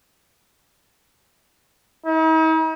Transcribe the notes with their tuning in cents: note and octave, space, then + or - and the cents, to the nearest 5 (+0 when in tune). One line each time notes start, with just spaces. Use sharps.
D#4 +45